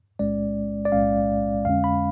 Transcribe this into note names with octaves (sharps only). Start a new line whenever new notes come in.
B1 A2 G#3 C#4 D5
D5
B1 A2 G#3 C#4 F5
F2 D3 G#3 C#4 F5
B5